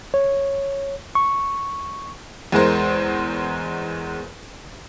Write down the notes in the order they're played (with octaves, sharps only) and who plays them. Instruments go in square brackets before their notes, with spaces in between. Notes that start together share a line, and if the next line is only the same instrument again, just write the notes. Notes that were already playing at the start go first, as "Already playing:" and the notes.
[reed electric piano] C#5
C#6
[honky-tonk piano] E2 G#3 A#4 C5